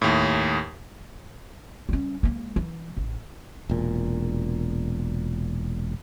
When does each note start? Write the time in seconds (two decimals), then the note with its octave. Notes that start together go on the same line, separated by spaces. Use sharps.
0.02 D#2 A2
1.89 G3 C#4
2.23 G#3 A#3
2.56 E3
2.97 A1
3.70 E1 A#2